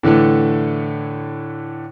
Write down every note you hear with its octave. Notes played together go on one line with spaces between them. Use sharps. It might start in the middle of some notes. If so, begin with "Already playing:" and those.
A2 D3 E3 A3